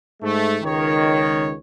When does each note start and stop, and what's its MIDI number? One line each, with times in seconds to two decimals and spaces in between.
0.22 0.57 44
0.22 0.57 57
0.63 1.53 37
0.63 1.53 51
0.63 1.53 73